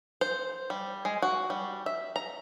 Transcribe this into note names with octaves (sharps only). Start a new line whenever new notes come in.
C5
G3
G#3
F#4
G3
E5
A#5